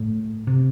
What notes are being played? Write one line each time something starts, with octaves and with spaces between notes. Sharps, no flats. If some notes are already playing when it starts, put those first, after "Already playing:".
Already playing: A2
C3